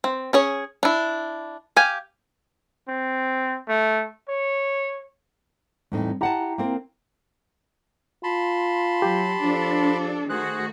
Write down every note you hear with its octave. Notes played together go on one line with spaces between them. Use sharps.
C4
C#4 G#4 C#5
D4 E4
G4 F5 G#5
C4
A3
C#5
E2 A2 G3 C4 D#4
E4 G4 F#5 G5 A5 A#5
A#3 C4 A#4
F4 A5 B5 C6
F#3 G4
F3 D4 A4
D#3 A3 F#4 G#4 C5 F#6